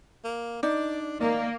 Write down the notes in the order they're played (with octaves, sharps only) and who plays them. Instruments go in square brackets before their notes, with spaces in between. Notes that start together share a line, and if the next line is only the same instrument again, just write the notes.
[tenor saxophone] A#3
[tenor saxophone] D4 [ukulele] D#4 [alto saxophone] D5
[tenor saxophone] D#3 [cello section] A#3 [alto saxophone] D5